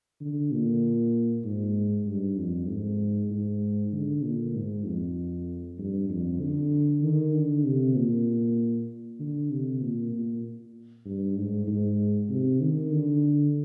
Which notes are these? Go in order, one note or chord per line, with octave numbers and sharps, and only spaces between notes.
D3
A#2
G#2
G2
F2
G#2
G#2
D3
A#2
G#2
F2
G2
F2
D3
D#3
D3
C3
A#2
D3
C3
A#2
A#2
G2
G#2
G#2
C3
D#3
D3